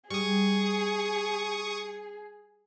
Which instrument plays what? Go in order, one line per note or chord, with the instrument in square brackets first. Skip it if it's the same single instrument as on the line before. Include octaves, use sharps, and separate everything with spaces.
[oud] G3 [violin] G#4 [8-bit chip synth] C#6 D#6